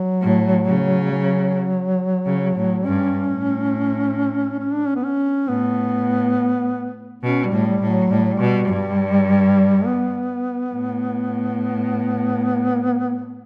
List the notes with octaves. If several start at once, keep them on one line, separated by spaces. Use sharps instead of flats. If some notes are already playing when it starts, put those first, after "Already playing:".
Already playing: F#3
A2
C#3
F#3
C#3
A2
G2 C#4
A2
C#4
D4
C#4
B3
C#4
A2 B3
B2 C#4
G3
A2
G3
A2
F#3
A2 G3
F#3
G3
B2
G2
B3
A2